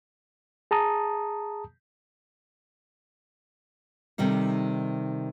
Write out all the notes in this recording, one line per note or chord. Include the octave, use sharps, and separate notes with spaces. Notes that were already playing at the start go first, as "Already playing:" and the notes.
G#4 A5 A#5 D#6
C3 D#3 G3 D#4 A4